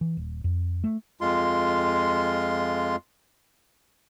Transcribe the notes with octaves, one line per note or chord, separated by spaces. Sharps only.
E3
D#1
F2
A3
F2 G#3 F4 C6